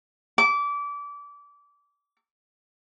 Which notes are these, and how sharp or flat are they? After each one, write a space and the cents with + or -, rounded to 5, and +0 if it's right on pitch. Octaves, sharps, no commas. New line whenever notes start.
D6 -25